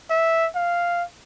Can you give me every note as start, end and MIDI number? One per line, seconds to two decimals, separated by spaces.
0.10 0.48 76
0.55 1.03 77